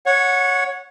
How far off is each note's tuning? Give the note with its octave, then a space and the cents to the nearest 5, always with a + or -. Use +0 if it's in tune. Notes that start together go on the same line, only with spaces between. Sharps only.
C#5 +0 F#5 -20